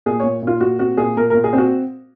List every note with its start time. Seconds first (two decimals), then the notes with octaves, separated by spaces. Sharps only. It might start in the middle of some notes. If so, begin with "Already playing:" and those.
0.06 A#2 G#4
0.20 A#2 C#5
0.42 A#2 F4
0.60 A#2 F#4
0.79 C4 F#4
0.97 A#2 G#4
1.17 A#2 A#4
1.30 A#2 A#4
1.44 G#4
1.53 C4
1.58 F#4